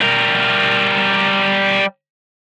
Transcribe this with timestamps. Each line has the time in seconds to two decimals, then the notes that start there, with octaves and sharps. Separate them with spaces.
0.01 G3 A#4